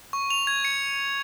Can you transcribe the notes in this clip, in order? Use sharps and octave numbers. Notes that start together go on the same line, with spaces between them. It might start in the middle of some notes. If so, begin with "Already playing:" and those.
C#6
F7
G#6
C#7